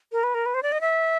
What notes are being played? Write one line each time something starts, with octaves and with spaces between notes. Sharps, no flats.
A#4
B4
A#4
B4
C5
D5
D#5
E5